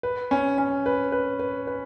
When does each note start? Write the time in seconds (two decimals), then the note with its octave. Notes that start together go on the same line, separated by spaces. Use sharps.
0.03 B4
0.31 C#4
0.58 C#4
0.86 B4
1.12 B4
1.39 B4
1.67 B4